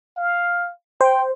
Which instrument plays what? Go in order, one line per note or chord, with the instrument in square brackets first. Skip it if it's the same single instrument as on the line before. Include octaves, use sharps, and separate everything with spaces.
[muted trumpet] F5
[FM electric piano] C5 [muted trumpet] G5